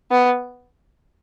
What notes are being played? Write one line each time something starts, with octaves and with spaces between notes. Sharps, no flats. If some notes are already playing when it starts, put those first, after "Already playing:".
B3